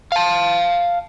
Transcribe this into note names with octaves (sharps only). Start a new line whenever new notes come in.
F5 A5